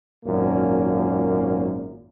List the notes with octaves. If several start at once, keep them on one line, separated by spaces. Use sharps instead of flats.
G#1 F#2 A#2 A#3